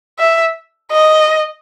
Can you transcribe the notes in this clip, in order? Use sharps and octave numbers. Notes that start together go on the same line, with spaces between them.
E5
D#5